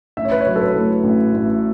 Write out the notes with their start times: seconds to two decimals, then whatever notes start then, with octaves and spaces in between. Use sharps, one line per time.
0.17 A1 E5
0.25 C#5
0.32 B4
0.40 C#5
0.47 F#3
0.56 A4
0.61 B4
0.75 A2
1.04 A1
1.34 A1